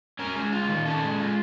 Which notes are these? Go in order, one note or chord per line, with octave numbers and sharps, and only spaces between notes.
C#4 A#4
G#3
F4
D#3
C#4 A4
G#3
F4